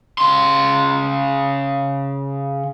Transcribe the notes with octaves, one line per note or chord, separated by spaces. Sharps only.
C#3 C6